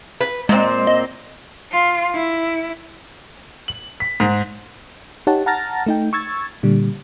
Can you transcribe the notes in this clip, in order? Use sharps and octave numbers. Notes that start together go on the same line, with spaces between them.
B4
A#2 G#3 C4
D#5
F4
E4
F#7
B6
G#2
D#4 G4 C#5 F#5 A5
F#5 A5 A#5 F6 A6 A#6
A3 D#4 G5
C#6 E6 G#6 A6
A#2 D3 G3